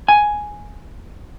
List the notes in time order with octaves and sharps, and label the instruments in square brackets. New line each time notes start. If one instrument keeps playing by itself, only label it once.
[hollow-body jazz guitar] G#5